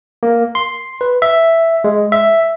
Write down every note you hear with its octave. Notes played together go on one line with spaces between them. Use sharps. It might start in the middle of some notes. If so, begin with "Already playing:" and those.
A#3
C6
B4
E5
G#3
E5